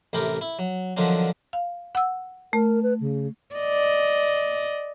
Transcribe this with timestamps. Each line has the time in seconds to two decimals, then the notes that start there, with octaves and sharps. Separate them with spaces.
0.13 A1 C3 A3 G4 A#4 B5
0.41 E4
0.59 F#3
0.97 D3 D#3 F3 F#3 C4 D4
1.53 F5
1.95 F#5 E6
2.53 A3 A#4
2.83 B4
3.00 C#3
3.56 D5 D#5